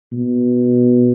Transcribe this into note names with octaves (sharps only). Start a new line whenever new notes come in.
B2